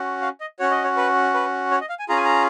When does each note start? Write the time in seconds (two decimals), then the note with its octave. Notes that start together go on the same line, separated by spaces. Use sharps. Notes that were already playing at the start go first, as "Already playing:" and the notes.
Already playing: C#4 F#4
0.22 F5
0.40 D#5
0.59 C#4 F#4 C#5
0.71 D#5
0.84 C#5
0.97 B4
1.34 B4
1.71 C#5
1.81 D#5
1.89 F5
1.99 G#5
2.09 C#4 F4 G#4 A#5
2.17 G#5
2.25 A#5